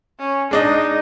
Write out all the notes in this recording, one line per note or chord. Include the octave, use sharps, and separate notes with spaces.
C#4
G#3 D4 D#4 D#5